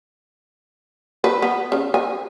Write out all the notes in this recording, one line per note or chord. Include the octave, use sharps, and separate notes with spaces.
B4
B3
C#3
G#5